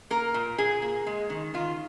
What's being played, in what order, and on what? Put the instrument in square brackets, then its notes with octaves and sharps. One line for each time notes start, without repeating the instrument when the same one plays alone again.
[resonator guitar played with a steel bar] A#3 A#4
A#2
A#2 G#4
A#3
G#3
D#3
D#3 F4